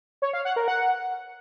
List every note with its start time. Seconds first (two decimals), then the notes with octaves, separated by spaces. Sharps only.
0.22 C#5
0.33 F5
0.45 F#5
0.56 A#4
0.68 F#5